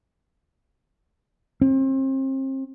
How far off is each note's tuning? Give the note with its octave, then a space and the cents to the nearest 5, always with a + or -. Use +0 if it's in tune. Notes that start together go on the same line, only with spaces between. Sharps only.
C4 +35